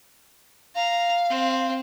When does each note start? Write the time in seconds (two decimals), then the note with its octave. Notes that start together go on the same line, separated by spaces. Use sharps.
0.75 F5 A#5
1.30 C4